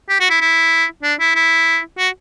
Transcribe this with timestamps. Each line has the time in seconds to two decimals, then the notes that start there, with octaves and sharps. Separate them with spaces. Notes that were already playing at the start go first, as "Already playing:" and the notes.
0.09 G4
0.20 F#4
0.30 E4
0.41 E4
1.03 D4
1.20 E4
1.35 E4
1.98 F#4